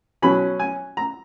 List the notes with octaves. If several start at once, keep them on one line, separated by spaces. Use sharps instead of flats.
B2 F#3 C#4 B5
G#5
A#5